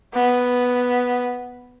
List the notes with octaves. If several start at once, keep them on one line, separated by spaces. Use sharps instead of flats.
B3